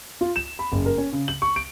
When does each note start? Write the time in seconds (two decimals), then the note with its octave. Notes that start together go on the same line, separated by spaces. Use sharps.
0.21 F4
0.36 E7
0.59 B5
0.72 F#1
0.86 A#4
0.98 C#4
1.13 C#3
1.28 F#7
1.42 C#6
1.56 D7